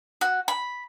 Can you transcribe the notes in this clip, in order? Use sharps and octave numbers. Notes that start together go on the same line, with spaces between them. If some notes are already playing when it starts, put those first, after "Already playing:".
F#4
B5